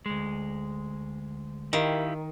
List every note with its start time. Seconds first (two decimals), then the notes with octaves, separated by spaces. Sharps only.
0.06 D2 G#3
1.73 D#3 E4 G4 F5